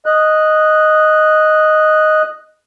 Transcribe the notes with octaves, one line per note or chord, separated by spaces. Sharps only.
D#5 F#6